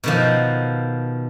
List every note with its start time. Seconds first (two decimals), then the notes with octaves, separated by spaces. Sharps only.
0.04 B2 D#3 F3